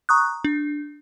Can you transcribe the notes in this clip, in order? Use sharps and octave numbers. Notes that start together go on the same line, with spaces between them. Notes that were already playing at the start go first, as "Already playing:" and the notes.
A#5 C#6 D#6 F#6
D4